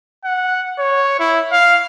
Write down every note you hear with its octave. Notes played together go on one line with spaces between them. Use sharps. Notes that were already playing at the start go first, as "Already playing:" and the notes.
F#5
C#5
E4
F5